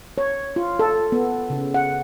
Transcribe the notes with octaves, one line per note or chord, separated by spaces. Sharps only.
C#5
F4
A4
B3
C#3
F#5